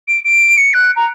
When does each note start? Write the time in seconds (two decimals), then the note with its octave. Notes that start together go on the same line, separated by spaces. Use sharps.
0.08 D7
0.25 D7
0.57 C#7
0.74 F#6
0.96 A#5